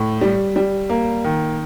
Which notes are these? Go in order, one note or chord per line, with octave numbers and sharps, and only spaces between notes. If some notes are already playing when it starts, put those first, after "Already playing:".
Already playing: A2
G3
G3
A#3
D#3